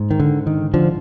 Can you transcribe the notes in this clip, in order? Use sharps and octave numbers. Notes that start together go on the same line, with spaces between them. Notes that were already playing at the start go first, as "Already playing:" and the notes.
Already playing: G#2
D#3
D3
D#3
D3 F3